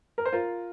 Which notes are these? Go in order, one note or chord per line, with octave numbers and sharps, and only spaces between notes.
A#4
C5
F4 A#4